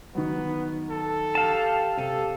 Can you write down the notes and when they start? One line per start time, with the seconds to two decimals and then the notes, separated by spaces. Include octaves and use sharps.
0.15 D#3 F#3 B3
0.90 A4
1.35 G4 F5 A5
1.97 C3 A4 D#7